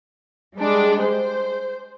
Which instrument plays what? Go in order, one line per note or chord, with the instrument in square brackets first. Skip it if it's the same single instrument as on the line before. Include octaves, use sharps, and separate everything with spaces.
[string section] G3 G#3 D4
C5